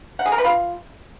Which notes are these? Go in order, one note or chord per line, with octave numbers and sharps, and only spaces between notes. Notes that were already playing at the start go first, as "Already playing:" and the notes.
F#5
G#4
A#4
B4
F4